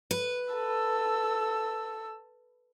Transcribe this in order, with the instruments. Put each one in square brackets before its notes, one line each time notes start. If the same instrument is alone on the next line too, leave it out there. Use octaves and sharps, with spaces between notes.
[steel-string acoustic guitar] B4
[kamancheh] A4 E6